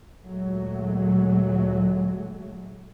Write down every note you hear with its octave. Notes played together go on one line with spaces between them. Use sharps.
D2 A#2 F#3 G#3 A3